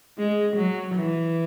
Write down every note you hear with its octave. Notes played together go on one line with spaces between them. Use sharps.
G#3
F#3
E3